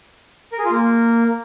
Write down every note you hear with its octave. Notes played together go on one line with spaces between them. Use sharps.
A#4
G#4
F4
A#3